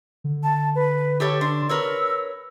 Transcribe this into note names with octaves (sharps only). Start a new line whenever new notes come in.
D3
A5
B4
G4 A4 C#5
D4 C6
A#4 B4 C#5 E6